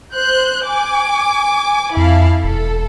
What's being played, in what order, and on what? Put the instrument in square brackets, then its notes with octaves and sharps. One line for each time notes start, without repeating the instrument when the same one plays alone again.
[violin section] C5 F#6 G6
G#5 D6
[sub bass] F2 [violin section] E4 F5 A5
[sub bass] E1 [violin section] A4